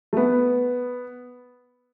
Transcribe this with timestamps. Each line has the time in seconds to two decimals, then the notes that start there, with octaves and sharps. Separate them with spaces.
0.13 A3
0.17 B3